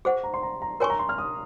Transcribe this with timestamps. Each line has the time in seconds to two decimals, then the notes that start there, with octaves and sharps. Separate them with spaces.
0.05 G#4 C5 F#5 C#6
0.24 A#5
0.34 C6
0.43 A#5
0.62 A#5
0.80 A#4 C#5 G#5 C6 C#6
0.90 A#5
0.99 C6
1.09 F6
1.18 D#6